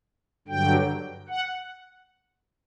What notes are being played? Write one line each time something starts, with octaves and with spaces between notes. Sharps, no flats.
G2 D3 F#3 G5
F#5